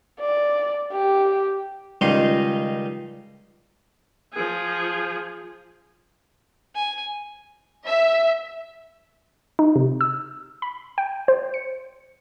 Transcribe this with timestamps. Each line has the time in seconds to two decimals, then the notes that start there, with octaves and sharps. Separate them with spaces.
0.20 D5
0.92 G4
2.01 C#2 D#3 G3 D#4 D#5 C6
4.33 F3 G#4
6.75 G#5
7.85 E5
9.59 D#4
9.76 C3
10.01 E6
10.62 B5
10.98 G5
11.28 C5
11.54 C#7